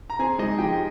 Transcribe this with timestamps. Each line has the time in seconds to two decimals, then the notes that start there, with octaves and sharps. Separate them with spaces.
0.10 A#5
0.19 C4 G#4 G#5
0.39 G#3 D#4 D#5
0.58 F3 G4 G5